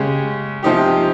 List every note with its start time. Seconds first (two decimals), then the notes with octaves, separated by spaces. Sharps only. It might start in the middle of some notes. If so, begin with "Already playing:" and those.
Already playing: C#3 G#3 C#4 G4
0.63 C3 F3 C4 D#4 G4